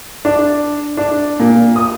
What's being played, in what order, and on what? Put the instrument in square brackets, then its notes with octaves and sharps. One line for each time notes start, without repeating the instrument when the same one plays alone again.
[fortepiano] D4
D4
A#2
D#6